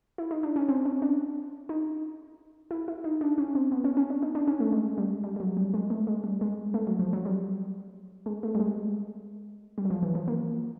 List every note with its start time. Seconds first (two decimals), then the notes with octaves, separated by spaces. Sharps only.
0.18 E4
0.31 D#4
0.43 D4
0.56 C#4
0.69 C4
0.85 C#4
1.02 D4
1.69 D#4
2.71 E4
2.88 E4
3.04 D#4
3.21 D4
3.38 C#4
3.55 C4
3.72 B3
3.84 C#4
3.97 C#4
4.10 D4
4.22 D#4
4.35 D4
4.48 C#4
4.60 A3
4.72 G#3
4.98 G3
5.24 G3
5.36 G3
5.40 F#3
5.57 G3
5.74 G#3
5.90 A3
6.07 G#3
6.24 G3
6.41 G#3
6.74 A3
6.87 F#3
6.99 F3
7.13 F#3
7.25 G3
8.26 G#3
8.43 A3
8.55 G3
8.60 G#3
9.78 G3
9.85 F#3
9.90 F3
10.03 E3
10.15 F3
10.28 A#3